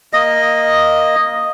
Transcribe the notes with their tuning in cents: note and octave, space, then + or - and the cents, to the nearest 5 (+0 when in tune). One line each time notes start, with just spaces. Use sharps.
A#3 +0 D#5 +0